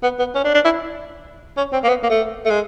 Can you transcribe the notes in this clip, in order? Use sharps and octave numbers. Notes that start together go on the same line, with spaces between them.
B3
B3
C#4
D4
D4
E4
C#4
C4
A#3
B3
A#3
A3
A3
G#3